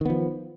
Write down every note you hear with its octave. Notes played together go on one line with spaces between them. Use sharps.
D#3 F3 B3